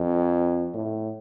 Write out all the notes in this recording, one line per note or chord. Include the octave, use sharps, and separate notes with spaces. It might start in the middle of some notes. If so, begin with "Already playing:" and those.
Already playing: F2
A2